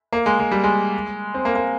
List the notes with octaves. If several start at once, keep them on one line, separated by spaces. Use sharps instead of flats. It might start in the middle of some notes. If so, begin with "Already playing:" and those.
A#3
G#3
G#3
G3
G#3
C4
A#3
A#3